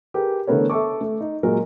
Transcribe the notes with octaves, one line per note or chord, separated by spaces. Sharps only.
G4 G#4 A#4 B4
D3 E3 A3 B3 A#4 C#5
A4 E5 A5 C#6 D6
A3
D#4
A#2 F#3 G#3 A#4